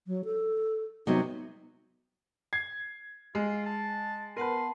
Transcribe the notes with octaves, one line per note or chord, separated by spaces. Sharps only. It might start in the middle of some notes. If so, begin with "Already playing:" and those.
F#3
A4
C3 F#3 B3 D#4
G#6 C7
G#3 F4
A5
B3 A#4 B4 F#5 A5 C6